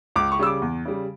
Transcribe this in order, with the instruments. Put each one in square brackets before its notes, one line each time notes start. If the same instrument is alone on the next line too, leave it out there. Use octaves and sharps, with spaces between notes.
[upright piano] C#2 D6
C#6
C#3 G3 E6
D6
E2
C#3 G3